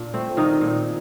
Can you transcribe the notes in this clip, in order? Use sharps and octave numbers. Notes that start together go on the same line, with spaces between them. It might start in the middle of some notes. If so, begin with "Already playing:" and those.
Already playing: A#2 D4
A3 C4
A#2 D#3 D#4
A#2